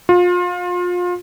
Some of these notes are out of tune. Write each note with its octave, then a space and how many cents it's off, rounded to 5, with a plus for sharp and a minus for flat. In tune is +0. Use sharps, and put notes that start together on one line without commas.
F4 +30